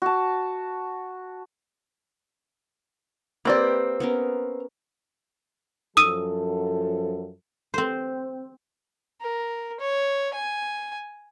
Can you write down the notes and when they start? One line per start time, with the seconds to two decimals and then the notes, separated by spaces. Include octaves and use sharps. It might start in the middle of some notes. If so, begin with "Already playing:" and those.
0.02 F#4 A5
3.45 A#3 C4 G4 B4 D5
4.00 B3 C#4 A#4
5.97 F#2 F3 A4 D#6 E6 D#7
7.74 C4 C5
9.21 A#4
9.80 C#5
10.34 G#5